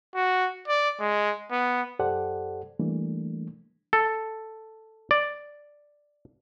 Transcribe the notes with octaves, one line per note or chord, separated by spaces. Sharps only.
F#4
D5
G#3
B3
F#2 G4 A4 C5 D5 F#5
E3 G3 A3 A#3 D4
A4
D5